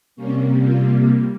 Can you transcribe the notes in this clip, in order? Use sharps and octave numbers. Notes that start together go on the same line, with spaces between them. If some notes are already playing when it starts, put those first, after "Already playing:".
C3 G3 A#3 C#4
F4